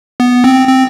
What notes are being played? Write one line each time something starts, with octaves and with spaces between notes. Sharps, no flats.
B3
C4
C4